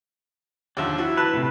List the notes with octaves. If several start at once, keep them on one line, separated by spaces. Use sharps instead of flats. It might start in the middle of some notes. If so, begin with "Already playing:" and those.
D#2 D3 F3 D4 E5
E4 F#4
B4 A5
A2 C3